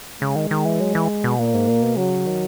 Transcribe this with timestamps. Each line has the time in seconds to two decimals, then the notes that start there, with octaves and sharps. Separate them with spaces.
0.21 C#3 G#3
0.36 D#3
0.51 D#3
0.65 E3
0.80 F#3
0.95 E3
1.24 B2
1.38 A#2 A#3
1.54 G#2
1.68 A#2
1.82 B2
1.97 C#3 F#3
2.26 D#3